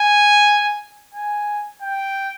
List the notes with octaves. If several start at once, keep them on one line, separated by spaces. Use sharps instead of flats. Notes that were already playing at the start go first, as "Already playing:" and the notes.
Already playing: G#5
G#5
G5